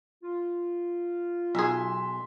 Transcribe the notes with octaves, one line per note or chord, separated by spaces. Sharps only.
F4
B1 G#4 E5 C6